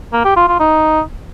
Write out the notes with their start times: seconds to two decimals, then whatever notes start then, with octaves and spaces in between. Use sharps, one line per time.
0.13 A#3
0.25 G4
0.36 F4
0.48 F4
0.60 D#4